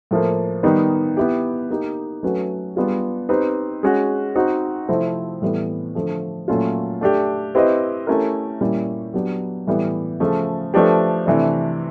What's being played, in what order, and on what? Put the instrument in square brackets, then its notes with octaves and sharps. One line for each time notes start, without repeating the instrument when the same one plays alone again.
[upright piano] A2 F3 A#3
D#3 G3 B3 D#4
B3 E4 G4
A#3 D#4 G4
F#3 A3 C#4 F#4 B4
G3 B3 D4 F4 G#4
C4 D#4 G4 B4
G#3 C#4 F#4
C4 D#4 F#4
C3 F3 A3 C4 E4
A2 E3 G3 B3 E4
D3 F3 A3
A#2 F#3 A3 C#4 F4
A3 D4 G4
C4 E4 G4 B4 D#5
A3 C#4 E4 G4 A#4
A#2 G3 A#3 C#4 E4
F#3 B3 D4 G4
A2 E3 G3 B3
C#3 F3 A3
F3 A3 D4 G4 B4
C3 E3 A3 D4